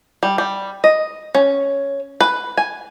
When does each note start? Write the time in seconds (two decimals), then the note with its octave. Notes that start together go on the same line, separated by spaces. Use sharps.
0.23 G3
0.38 G3
0.84 D#5
1.35 C#4
2.21 B4
2.57 G#5